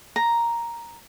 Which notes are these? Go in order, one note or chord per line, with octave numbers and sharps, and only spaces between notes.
A#5